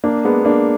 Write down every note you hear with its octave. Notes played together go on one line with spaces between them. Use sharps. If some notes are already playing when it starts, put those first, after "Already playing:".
A#3 D4
G#3 B3
A#3 D4